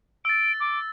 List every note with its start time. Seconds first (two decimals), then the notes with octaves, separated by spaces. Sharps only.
0.25 E6 A6 D7
0.60 D6